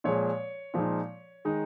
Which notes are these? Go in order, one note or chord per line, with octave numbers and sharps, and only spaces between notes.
A#2 F3 G#3 C#5
A#2 F3 G#3 D#4
D#3 G#3 D#4